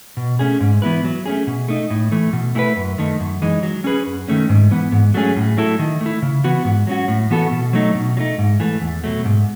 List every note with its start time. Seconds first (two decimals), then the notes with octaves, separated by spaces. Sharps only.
0.17 B2
0.39 A3 C#4 G#4
0.61 G#2
0.82 E3 B3 E4 B4
1.04 F#3
1.26 A3 C#4 G#4
1.47 B2
1.68 A3 D#4
1.91 A2
2.12 E3 A3
2.33 B2
2.55 A3 E4 G#4 B4
2.77 F#2
2.98 D#3 A3
3.20 F#2
3.42 E3 G#3 D#4
3.63 F#3
3.84 C#4 G#4 B4
4.06 F#2
4.28 D#3 A3 C#4
4.49 G#2
4.71 E3 B3
4.92 G#2
5.14 F#3 A3 C#4 G#4
5.36 A2
5.57 F#3 A3 E4 A4
5.79 D#3
6.01 A3
6.06 E4
6.22 C#3
6.44 E3 B3 F#4
6.65 G#2
6.87 F#3 C#4 F#4
7.08 A2
7.30 E3 B3 F#4 A4
7.52 B2
7.73 F#3 A3 D#4
7.95 B2
8.17 F#3 A3 D#4
8.38 G#2
8.60 E3 A3
8.82 E2
9.04 B2 F#3 A3
9.25 G#2